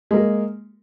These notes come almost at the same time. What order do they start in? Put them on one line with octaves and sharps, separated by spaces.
G#3 A#3 A#4